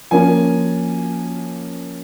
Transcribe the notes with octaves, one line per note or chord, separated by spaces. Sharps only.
F3 A#3 C#4 G#5